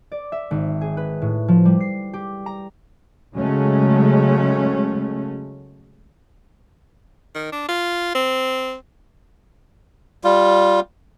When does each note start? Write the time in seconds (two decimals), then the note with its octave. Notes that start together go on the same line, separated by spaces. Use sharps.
0.12 D5
0.32 E5
0.51 G#1
0.81 G#4
0.97 B4
1.22 A2
1.48 F3
1.65 G3
1.80 C7
2.13 G4
2.46 A#5
3.34 C#3 F#3 G#3 A3 C#4
7.35 D#3
7.52 D4
7.69 F4
8.15 C4
10.24 G3 F4